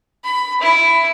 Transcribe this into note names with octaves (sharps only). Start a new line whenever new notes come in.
B5
E4